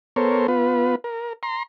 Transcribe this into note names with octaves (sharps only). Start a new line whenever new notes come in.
B3 A4 A#4 C5 C#5
B3 F4 B4
A#4
A#5 C6